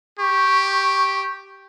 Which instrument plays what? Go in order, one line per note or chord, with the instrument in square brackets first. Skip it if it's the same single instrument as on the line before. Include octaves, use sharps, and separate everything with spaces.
[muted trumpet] G4 [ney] C#6